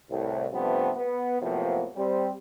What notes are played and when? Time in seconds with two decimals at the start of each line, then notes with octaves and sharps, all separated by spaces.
0.10 C2 A2
0.53 G2 C3 F3 A3 B3 C4
0.97 B3
1.42 A2 C3 F3 F#3 A#3 B3
1.96 G3 C4